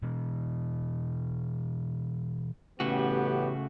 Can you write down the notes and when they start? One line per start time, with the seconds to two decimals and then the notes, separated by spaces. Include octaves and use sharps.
0.03 B2 E3
2.80 A1 C#3 A3 B3 F#4 G4